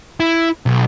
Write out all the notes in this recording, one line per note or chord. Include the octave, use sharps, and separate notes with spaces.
E4
B1